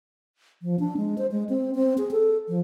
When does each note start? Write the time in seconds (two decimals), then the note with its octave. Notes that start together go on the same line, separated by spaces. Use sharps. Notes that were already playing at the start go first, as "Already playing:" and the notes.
0.62 F3
0.79 D4
0.97 G#3
1.18 C5
1.32 G#3
1.49 C4
1.75 C4
1.98 G#4
2.11 A4
2.48 F3